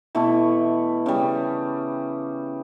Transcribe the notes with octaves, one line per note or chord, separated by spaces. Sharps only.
B2 E3 A3 E4
C#3 G3